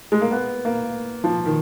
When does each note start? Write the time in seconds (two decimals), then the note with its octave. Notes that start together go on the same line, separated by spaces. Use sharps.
0.12 G#3
0.21 A#3
0.31 B3
0.65 A#3
1.24 F3
1.46 D#3